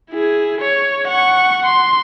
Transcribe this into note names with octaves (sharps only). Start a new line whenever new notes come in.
E4 G#4
C#5
F#5 C#6
C6